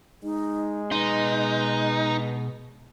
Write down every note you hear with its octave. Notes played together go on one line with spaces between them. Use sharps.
G#3 D#4
B2 D#4 B4 C6